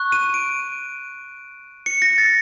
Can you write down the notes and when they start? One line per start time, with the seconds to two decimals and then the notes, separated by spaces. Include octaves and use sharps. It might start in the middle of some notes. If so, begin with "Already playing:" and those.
Already playing: C#6 F#6
0.12 D#7
0.34 D7
1.86 C#7
2.02 A#6
2.18 A6